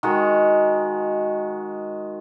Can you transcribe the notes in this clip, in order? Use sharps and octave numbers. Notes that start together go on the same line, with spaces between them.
D#3 G#3 F#4